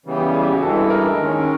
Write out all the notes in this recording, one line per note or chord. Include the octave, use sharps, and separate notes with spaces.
C#3 E3 G3 B3
G4
G#4
G4
F#4
G2 E3 G#3 A4
A#4
D#2 D#3 G#3 C#4